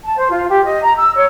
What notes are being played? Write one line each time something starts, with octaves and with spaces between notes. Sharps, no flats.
A5
C5
F4
G4
D#5
A#5
E6
C#5